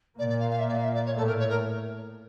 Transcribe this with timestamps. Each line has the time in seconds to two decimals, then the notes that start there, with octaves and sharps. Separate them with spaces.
0.18 A#2 A#3 D5
0.29 D5
0.39 F5
0.50 F5
0.59 E5
0.68 D5
0.75 F5
0.83 E5
0.94 D5
1.06 C#5
1.16 A2 A3 A4
1.27 A#4
1.39 C#5
1.49 A#4